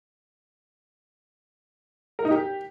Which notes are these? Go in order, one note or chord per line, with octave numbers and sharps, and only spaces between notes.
A#4
D#4
G4